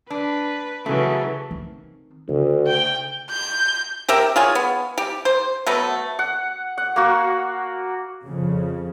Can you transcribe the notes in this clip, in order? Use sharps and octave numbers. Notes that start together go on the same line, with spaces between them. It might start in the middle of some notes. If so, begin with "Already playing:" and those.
D4 B4
C#3 E3 F#3 A3 C#4
D#3 C4
D2 C#3
G5
G6
G4 A#4 E5 G5
F4 G#4 C#5
B3
G4
C5
F#3 A3 B3
F#5
F#5
A#3 F#4
F2 C#3